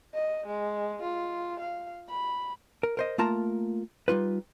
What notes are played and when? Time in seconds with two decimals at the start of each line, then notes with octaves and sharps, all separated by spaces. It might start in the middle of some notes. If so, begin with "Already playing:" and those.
0.14 D#5
0.46 G#3
1.02 F4
1.60 F5
2.09 B5
2.83 A#4
2.97 A#4 C5 D#5
3.18 A3 A#3 F4 A#4 A5 A#5
4.08 G3 D#4 F4 B4